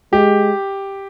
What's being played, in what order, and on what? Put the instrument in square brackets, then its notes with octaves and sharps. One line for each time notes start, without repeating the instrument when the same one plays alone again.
[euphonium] G#3 [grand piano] G4